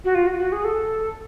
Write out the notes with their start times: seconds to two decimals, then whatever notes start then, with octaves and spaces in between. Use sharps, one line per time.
0.04 F#4
0.15 F4
0.27 F#4
0.39 F#4
0.52 G#4
0.64 A4